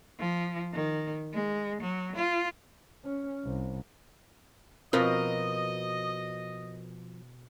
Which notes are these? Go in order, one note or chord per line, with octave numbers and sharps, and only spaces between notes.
F3
D#3
G#3
F#3
F4
C#4
C2
B2 F3 C4 F4 A#4 B4 D#5